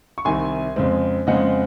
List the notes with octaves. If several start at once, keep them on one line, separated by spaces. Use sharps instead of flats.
C#6
C2 C3 D#3 G#5 C6
F2 C#3 G#3 C4
F2 C#3 G#3 C4 D#5 F#5